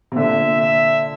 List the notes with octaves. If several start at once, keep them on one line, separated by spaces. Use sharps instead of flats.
C3
A#2 D3 E5
E5